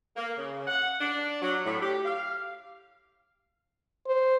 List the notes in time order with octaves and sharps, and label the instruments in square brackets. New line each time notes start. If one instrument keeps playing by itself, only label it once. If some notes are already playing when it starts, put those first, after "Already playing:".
[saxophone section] A#3
C#3
F#5
D4
F#3
A2
G4
F5
[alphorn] C5